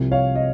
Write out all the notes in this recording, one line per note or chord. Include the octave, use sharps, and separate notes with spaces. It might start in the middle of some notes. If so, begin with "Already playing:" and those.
Already playing: C2 C3 F3
C#5 F5
D#5